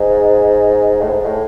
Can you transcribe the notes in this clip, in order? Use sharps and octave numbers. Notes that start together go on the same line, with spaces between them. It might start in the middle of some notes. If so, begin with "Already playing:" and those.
Already playing: G#2
A2
G#2
A2